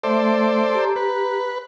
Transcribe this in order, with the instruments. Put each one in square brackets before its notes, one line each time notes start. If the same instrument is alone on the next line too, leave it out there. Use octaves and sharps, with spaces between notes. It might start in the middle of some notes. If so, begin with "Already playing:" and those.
[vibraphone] A3 E5 [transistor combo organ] A4 C5 D5
[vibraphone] G4 A#5
[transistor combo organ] B4